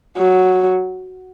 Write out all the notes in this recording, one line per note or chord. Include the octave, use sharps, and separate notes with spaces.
F#3